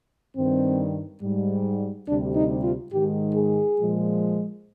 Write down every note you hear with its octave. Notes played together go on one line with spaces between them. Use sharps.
G2 D#3 G3 C4
G#2 G3
D2 C3 G3 D4
D#4
F4
G#2 D#3 G#3 G4
G#4
A#2 F3 G#3